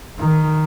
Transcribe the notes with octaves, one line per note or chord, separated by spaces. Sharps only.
D#3